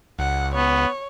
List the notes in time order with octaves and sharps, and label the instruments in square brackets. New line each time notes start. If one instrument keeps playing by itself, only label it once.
[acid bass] C#2 [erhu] F#5
[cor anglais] B3 [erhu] C#5